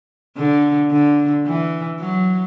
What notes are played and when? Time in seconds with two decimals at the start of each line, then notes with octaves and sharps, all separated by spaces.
0.37 D3
0.91 D3
1.46 E3
2.00 F#3